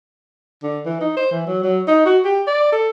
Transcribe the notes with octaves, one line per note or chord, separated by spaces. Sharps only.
D3
E3
D#4
C5
E3
F#3
F#3
D#4
F#4
G4
D5
A4